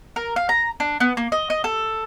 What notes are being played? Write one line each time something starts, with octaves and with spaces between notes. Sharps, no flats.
A#4
F5
A#5
D4
B3
A#3
D#5
D#5
A4